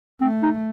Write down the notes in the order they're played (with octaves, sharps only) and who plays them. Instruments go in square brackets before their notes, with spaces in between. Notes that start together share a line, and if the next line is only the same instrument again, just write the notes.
[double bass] A3 [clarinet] C4
[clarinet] D#4